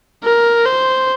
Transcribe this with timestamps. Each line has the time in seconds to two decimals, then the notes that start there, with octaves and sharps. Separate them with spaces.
0.24 A#4
0.66 C5